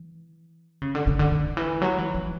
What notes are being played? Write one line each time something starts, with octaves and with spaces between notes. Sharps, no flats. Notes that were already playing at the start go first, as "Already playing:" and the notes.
Already playing: E3
C#3
D3
C#3
D3
D3
E3
F#3
E3
E3